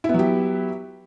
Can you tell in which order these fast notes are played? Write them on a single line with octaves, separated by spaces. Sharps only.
E4 B3 F#3 G4